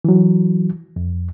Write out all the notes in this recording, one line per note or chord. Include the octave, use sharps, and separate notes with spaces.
E3 F#3
F2